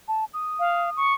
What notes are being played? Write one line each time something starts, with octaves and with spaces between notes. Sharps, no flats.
A5
D#6
F5
C#6